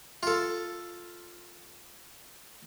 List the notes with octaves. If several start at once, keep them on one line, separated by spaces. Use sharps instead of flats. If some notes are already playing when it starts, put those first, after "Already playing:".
F4 A4